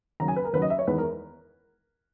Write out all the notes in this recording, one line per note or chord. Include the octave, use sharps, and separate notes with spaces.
D#2 C#3 F#3 A#5
G#5
B4
A#4
D#2 C#3 F#3 B4
D#5
E5
C#5
E2 D#3 G#3 D#4 B4
A#4